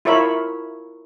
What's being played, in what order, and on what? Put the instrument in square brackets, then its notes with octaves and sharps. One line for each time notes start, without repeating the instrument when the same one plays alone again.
[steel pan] E4 F4 A#4 C#5 E5 B5